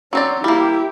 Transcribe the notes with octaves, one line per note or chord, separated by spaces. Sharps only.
F#3 C4 C#4 D5
G3 A#3 E4 G4